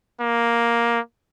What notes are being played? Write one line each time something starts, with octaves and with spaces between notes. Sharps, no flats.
A#3